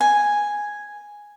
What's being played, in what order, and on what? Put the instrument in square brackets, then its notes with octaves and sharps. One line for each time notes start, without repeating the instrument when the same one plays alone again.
[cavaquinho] G#5